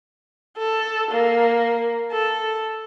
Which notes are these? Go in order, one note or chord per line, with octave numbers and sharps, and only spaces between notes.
A4
A#3
A4